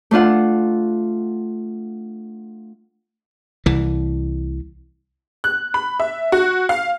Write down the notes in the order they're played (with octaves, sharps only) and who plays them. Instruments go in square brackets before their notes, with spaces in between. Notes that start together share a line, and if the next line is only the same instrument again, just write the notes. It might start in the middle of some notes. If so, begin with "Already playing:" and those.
[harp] A3 D4 F4 F#5
[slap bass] C2 E3
[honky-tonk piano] F#6
B5
E5
F#4
F5